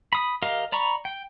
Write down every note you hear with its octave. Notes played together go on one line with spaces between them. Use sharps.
B5 D#6
G4 A#4 D#5 F5
D5 A#5 B5 C#6
G5